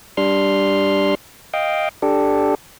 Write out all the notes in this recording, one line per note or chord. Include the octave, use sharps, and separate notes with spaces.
G3 D4 C6 F6
D#5 F5 G5
D4 G4 A4